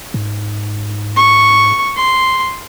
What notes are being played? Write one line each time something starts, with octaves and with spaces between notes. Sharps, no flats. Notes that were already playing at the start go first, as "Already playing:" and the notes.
G#2
C#6
C6